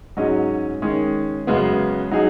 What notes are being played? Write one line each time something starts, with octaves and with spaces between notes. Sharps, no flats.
G#2 F#3 C#4 G#4 D#5
D#3 G#3 C#4
F#2 C#3 G#3 B3
F#3 D#4 G#4